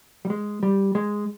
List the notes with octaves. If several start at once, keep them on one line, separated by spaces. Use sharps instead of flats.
G3
G#3
G3
G#3